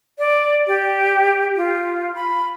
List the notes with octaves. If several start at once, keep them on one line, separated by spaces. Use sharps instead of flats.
D5
G4
F4
B5